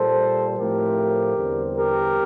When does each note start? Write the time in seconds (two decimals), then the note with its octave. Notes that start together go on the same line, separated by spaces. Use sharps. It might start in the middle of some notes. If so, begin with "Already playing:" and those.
Already playing: A#2 G3 A#3 A4 C5
0.58 A2 F3 A3 C4 G4 A#4
1.37 E2 D3 G3 C4
1.76 G4 A#4